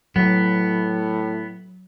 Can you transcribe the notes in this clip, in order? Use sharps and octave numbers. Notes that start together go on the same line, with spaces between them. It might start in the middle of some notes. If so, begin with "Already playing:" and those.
A2 F#3 B3